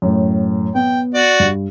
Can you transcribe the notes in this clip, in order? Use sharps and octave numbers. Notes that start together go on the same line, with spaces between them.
F#2 A2
B3 G5
F#4 D5
G2